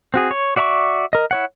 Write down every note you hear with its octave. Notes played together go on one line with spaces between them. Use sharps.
C4 F#4 G#4
C#5
F#4 D5 E5 A#5 C#6
A#4 D#5
E4 C#5 F#5